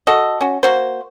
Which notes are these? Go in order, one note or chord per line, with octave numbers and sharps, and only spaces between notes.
F#4 A4 D#5
C#4 F#4
A#3 F#4 C5